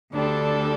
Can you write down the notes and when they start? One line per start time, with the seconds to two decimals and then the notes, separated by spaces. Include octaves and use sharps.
0.13 D2 D3 G3 D4 A4